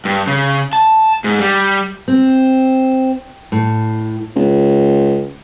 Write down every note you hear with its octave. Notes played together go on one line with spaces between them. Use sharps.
G2
C#3
A5
G#2
G3
C4
A2
C#2